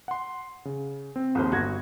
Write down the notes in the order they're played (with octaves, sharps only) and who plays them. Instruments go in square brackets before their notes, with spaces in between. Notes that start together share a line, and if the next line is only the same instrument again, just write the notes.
[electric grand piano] F#5 C6
C#3
C4
[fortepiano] A#1 D#2 C5
[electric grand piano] G1 G#6 A#6 [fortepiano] F#4